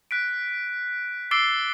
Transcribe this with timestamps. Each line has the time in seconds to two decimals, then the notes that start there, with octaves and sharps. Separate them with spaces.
0.11 F#6 B6 D7
1.31 D6 E6 A6 C7 D7 G7